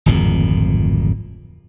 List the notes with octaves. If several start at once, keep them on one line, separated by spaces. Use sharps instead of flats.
D1 G#1 F2 A#2